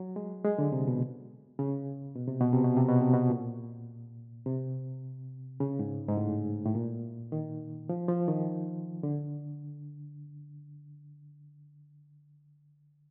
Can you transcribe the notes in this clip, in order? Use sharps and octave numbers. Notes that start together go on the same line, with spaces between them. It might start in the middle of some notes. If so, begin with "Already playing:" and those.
Already playing: F#3
G#3
G#3
D3
C3
B2
C#3
B2
C3
B2
C3
B2
C3
B2
C3
B2
A#2
C3
C#3
G#2
G#2
A2
A2
A#2
D#3
F3
F3
D#3
D3